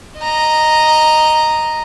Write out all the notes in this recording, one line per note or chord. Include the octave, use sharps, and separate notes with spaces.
D#5 A#5